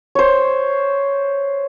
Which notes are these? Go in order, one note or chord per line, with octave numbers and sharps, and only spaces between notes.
C5 C#5